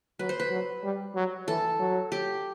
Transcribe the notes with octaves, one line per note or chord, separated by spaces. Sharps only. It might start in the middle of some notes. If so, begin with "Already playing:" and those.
F#3 B4
C5
B4
F#3
G3
F#3
E3 A4
F#3
G4